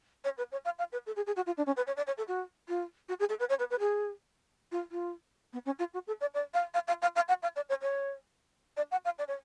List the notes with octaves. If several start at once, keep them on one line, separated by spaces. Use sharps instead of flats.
C#5
B4
C#5
F5
F5
B4
A4
G#4
G#4
F#4
F4
D4
C#4
B4
C#5
D5
C#5
A4
F#4
F4
F#4
G#4
A4
B4
C#5
B4
B4
G#4
F4
F4
B3
C#4
F4
F#4
A4
D5
D5
F5
F5
F5
F5
F5
F#5
F5
D5
C#5
C#5
D5
F#5
F5
D5
C#5